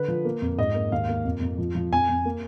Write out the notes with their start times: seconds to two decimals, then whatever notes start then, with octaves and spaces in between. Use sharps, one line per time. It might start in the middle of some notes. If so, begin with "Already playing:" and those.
Already playing: D3 B4
0.08 F3
0.25 A#3
0.42 F2
0.58 G#2 D#5
0.75 A#3
0.92 D#2 F5
1.09 A#3
1.25 F2
1.41 F2
1.58 F3
1.75 F3
1.92 F2 G#5
2.09 F2
2.25 A#3